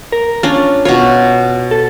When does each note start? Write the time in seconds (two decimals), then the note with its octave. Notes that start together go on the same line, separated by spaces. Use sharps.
0.12 A#4
0.43 C#4 D4 F4
0.85 B2 F4 C#5
1.71 A4